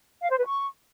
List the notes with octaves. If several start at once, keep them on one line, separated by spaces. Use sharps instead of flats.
F5
C5
B4
C#6